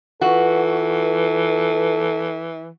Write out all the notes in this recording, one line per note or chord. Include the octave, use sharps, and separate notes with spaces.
E3 F4 F#4 A4 B4